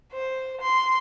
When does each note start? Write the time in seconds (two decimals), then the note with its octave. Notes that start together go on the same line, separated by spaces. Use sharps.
0.12 C5
0.61 C6